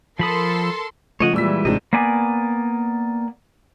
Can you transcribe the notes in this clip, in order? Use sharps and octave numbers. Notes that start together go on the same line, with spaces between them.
F3 A4 A#4 B5 C6 D#6
C#3 F3 A3 C#5 D#5 F#5
A#2 E3 G3 G#3 E6 B6
A1 G#2 C3 D4 D#4 D#5
A#3 B3 D5 G#5